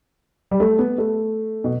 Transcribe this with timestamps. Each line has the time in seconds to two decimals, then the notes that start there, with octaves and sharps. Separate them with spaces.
0.51 G3
0.60 A3
0.79 B3
0.98 A3
1.64 B2